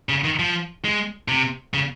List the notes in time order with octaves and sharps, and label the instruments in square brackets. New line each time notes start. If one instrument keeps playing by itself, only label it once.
[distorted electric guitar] C#3
D#3
F3
G#3
C3
C#3